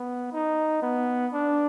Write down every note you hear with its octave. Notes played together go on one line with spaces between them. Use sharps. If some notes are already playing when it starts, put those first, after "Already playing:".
Already playing: B3
D#4
B3
D4